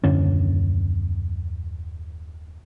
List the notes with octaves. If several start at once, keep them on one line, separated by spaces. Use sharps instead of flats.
D#1 F#2 D3 C#4